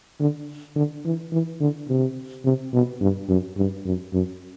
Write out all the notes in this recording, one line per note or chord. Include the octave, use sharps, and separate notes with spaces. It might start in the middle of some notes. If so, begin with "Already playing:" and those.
D3
D3
E3
E3
D3
C3
C3
B2
G2
F#2
G2
F#2
F#2